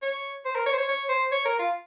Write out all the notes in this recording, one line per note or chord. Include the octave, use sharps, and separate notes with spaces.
C#5
C5
A#4
C#5
C5
C#5
C#5
C5
C#5
A#4
F4